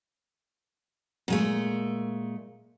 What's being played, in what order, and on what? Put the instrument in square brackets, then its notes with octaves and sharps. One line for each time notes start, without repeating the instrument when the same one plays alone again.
[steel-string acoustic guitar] A#2 G#3 A3